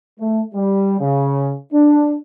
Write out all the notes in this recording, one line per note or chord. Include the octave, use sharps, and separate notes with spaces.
A3
G3
C#3
D4